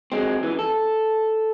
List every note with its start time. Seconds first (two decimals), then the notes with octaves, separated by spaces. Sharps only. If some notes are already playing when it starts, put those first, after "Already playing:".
0.12 F#3 G#3 C4
0.43 F#2 E3
0.59 A4